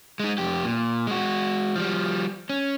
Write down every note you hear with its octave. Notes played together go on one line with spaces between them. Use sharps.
G#3 D#4
F2 G4
A#2
G#3 F#4
F3 G3
C#4